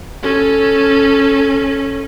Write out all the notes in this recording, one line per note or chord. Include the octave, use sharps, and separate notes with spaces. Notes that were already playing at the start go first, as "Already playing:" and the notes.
C#4 A4